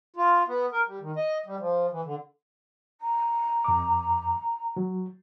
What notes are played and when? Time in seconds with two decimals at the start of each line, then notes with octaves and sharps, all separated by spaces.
0.16 F4
0.47 B3
0.72 A#4
0.87 G3
1.00 D#3
1.16 D#5
1.46 G3
1.60 F3
1.91 E3
2.04 D3
3.01 A#5
3.64 F2 D6
4.76 F#3